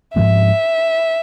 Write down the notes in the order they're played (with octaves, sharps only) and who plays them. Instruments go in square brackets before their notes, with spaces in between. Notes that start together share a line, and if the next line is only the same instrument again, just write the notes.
[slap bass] G#2 F3 G#3 C4 [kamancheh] E5